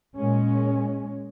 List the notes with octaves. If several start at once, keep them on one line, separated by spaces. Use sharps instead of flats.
A#2 G#3 C#4